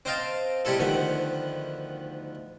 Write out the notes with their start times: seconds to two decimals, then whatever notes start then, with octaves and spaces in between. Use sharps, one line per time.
0.05 C4 C5 D#5 F5 G5 A5
0.65 C3 G3 G#3 E4 A4
0.79 D2 D#3 F3 B3